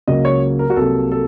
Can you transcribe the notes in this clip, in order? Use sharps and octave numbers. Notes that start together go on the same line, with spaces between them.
C#2 C#3 F#3 A#3 D#5
C#5
A#4
F#4
C2 C3 F#3 A#3 A4
A4